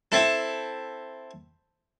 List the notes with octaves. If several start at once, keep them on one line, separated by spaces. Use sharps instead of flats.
C4 E4 A4